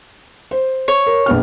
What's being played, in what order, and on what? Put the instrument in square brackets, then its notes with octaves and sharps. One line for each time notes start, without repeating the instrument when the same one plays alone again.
[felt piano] C5
[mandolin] C#5
[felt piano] A#4
A#1 B3 F6